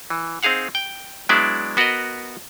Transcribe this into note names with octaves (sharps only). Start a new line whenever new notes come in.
E3
C4 D#4 G#4 F5 F#5
G5
F#3 G#3 B3 D4 E4 D5
B3 F#4 A#4 B4 D#5